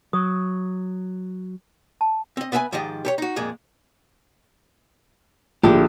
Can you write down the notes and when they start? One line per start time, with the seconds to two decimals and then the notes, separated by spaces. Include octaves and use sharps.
0.13 F#3 D#6
2.01 A5
2.37 C4 D#5
2.52 B3 B4 E5 G5 G#5 B5
2.72 G#2 D#3 F3 G4 D#5
3.05 G4 A4 C#5
3.18 D#4 F#4
3.36 F2 A#2 G#3
5.63 A#1 D3 E4 G4